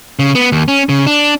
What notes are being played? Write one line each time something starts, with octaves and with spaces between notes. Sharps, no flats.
C#3
B3
D#2
C#4
C#3
D4